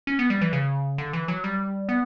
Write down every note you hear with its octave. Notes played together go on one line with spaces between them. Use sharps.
C#4
B3
G3
E3
C#3
D3
E3
F#3
G3
B3